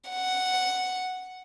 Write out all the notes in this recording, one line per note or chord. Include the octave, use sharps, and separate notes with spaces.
F#5